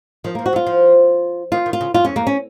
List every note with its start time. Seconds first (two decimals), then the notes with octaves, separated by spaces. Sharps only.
0.24 D#3 F3
0.35 F3 A#3
0.46 F#4
0.53 F#3
0.56 F4
0.67 F3
1.52 D#3 F4
1.66 D#3
1.73 F4
1.81 C#3
1.94 F#2 F4
2.05 F2 C#4
2.16 F2 A#3
2.27 C#4